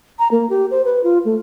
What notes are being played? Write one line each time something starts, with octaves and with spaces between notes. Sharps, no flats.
A#5
A#3
G4
C5
B4
F4
A3